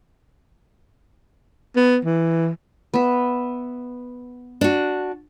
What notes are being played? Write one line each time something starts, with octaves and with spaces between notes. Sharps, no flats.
B3
E3
B3 E5
D4 F#4